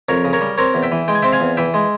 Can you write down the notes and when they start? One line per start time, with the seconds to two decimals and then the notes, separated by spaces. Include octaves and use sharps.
0.09 F2 A#4 C#5
0.25 C#3
0.33 A#4 C#5
0.41 G3
0.58 C4 A#4 C#5
0.74 E2
0.82 E5 G5
0.92 E3
1.08 G#3 G5
1.15 G#5
1.22 C4 E5 G5
1.32 F5 G#5
1.40 E2
1.57 E3 E5 G5
1.74 G#3